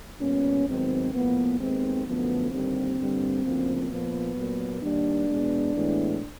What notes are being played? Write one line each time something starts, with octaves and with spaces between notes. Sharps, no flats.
A#2 G3 B3 C#4
G#2 D#3 F#3 B3 C4
A2 F3 A#3 B3
D#2 D#3 G#3 B3 C4
F#2 D3 F3 A3 B3
D#2 D3 G3 A#3 C4
G2 D3 G3 A#3
D2 C#3 F3 A#3
A#2 F3 A#3 B3
A#2 F#3 A#3
D#2 D#3 G3 A#3 D4
E2 B2 G#3 B3
A2 E3 G#3 B3